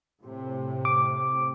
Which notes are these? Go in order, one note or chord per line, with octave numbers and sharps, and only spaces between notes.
A2 C3
D6